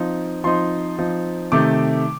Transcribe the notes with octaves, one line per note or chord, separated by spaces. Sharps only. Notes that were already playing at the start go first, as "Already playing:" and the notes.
Already playing: F3 C4 D#4
F3 C4 D#4 C6
F3 C4 D#4
C3 D#3 A3 D6